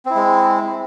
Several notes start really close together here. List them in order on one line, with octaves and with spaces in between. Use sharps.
C4 E4 G#3